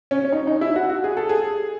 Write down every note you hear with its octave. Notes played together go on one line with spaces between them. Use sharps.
C#4
C#4
D#4
D#4
E4
F#4
F#4
G#4
A4
G#4